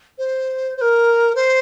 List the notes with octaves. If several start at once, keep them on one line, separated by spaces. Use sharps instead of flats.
C5
C5
A#4
C5